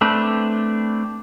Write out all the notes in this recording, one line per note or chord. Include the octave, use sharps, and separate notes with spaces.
A3 C4 D4 B4